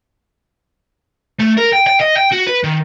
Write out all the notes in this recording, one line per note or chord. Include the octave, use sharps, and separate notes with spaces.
A3
A#4
G5
G5
D#5
G5
F#4
B4
D#3